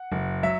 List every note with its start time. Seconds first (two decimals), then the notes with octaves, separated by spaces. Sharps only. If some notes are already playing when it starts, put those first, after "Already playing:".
Already playing: F#5
0.12 F#1
0.43 F#3 E5